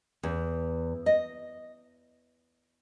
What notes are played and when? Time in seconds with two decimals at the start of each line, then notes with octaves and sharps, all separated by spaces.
0.23 E2
1.06 D#5